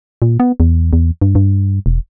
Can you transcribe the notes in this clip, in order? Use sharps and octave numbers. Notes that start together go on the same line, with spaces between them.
A#2
B3
E2
E2
G2
G2
E1